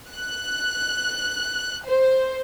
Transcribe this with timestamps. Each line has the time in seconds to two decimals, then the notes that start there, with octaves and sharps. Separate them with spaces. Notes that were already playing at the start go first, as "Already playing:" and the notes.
0.12 F#6
1.87 C5